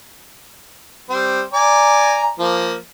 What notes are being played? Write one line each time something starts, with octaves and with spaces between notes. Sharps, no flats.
G3 C4
D5 G#5 A#5
F3 A#3